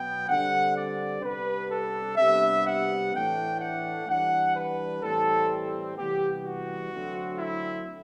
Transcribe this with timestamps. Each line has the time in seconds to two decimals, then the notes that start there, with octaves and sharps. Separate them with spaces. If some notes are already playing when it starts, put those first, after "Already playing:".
Already playing: B2 F#3 B3 G5
0.28 D3 G3 C4 F#5
0.75 D5
1.22 C3 G3 B3 D4 B4
1.70 A4
2.17 C3 G3 B3 D4 E5
2.65 F#5
3.13 A2 E3 A3 D4 G5
3.60 F#5
4.07 E3 G3 D4 F#5
4.55 B4
5.02 A2 E3 G3 C4 A4
5.96 C3 E3 G3 B3 G4
6.44 F#4
6.91 D3 F#3 A3 C4
7.38 E4